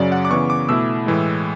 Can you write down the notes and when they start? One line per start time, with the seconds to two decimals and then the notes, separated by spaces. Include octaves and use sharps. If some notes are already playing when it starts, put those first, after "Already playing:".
Already playing: F#2 C#3 F#3 D5
0.12 F#5
0.25 D6
0.30 C#3 E3 B3 C#6
0.50 D6
0.69 B2 A3 E4 E6
1.06 A2 E3 G#3